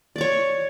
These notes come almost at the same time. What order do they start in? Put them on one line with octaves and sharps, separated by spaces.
D5 D6 C#5